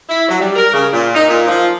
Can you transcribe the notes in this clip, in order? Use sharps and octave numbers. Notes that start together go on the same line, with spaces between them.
E4
F#3
G3
A#4
C#3
A#2
D#4
A#2
F3